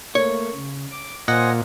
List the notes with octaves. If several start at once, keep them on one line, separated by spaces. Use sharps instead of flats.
A3 A#3 C#5
C#3
D6
A#2 C5 D#5 F#5 G#5 A#6